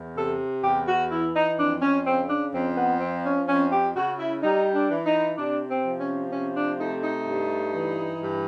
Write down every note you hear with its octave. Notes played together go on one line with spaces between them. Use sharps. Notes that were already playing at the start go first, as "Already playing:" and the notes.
Already playing: E2
C3 A4
E2 G4
F#4
E3 E4
D#4
F2 D4
C#4
C#3 C4
D4
F2 C4
B3
F3 C4
C#4
F2 C#4
G4
C#3 F#4
E4
G3 D#4
D4
E3
D#4
C3 D4
C4
F3
C#4
C3 C#4
D4
A3 D#4
D#4
G2
E3
G2